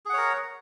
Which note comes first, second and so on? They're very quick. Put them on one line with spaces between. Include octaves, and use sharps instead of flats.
G#4 F#5 C#5 A#4